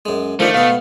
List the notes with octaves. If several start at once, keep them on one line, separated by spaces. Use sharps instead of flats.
F#2 G#3
D#3 F3 A3 D4
B2 B3 F5